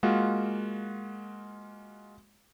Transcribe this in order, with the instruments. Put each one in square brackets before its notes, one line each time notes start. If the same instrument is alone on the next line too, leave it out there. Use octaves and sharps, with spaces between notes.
[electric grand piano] G#3 A#3 F4 F#4